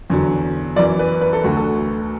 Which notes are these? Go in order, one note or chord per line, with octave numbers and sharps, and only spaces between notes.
E2 D3 F#3
F#2 E3 D5
B4
B4
A4
D2 D3 F#3 F#4
A4